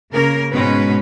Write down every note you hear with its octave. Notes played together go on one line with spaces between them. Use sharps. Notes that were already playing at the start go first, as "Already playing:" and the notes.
C#3 A#3 A#4
G#2 B2 G#3 C#4 B4